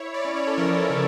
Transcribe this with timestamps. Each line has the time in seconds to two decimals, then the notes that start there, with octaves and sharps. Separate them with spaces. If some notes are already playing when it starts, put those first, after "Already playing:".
Already playing: E4 C#5
0.14 D5
0.25 C#4
0.36 C#5
0.47 A4
0.58 F3 A#4
0.90 C#3